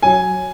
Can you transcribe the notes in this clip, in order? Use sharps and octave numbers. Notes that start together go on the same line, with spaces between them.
F#3 G#5